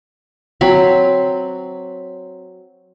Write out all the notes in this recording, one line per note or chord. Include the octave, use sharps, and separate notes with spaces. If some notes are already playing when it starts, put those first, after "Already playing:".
F#3 C4 B5